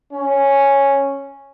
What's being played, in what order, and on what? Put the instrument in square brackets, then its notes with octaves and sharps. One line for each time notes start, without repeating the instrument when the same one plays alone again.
[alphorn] C#4